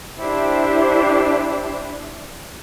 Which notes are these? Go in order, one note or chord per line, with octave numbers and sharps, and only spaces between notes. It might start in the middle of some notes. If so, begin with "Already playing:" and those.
D4 E4 G4 C5